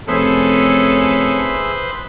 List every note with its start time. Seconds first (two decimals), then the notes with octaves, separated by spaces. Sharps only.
0.08 F1 C#4 G#4 A4 B4 C5 E5